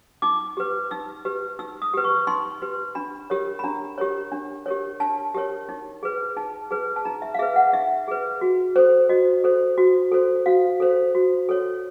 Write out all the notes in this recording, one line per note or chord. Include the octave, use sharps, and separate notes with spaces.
D#4 D6
G4 B4
D#4 E6
G4 B4
D#4 E6
D#6
G4 B4
C#6
D#4 C6
G4 B4
D4 B5
G4 A#4 C#5
B5
D4 A#5
G4 A#4 C#5
D4
G4 A#4 C#5
D4 A5
G4 A#4 C#5
D#4
G#4 B4
D#4 A5
G#4 B4
A5
D#4 A#5
E5
F5
G#4 B4 E5
F#5
D#4 E5
G#4 B4
F#4
A4 C5
F#4 D#5
A4 C5
F#4
A4 C5
F#4 F5
A4 C5
F#4
A4 C#5